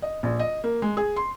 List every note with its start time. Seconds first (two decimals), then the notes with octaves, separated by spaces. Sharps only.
0.02 D#5
0.23 A#1
0.39 D#5
0.64 A#3
0.82 G#3
0.97 G#4
1.16 C6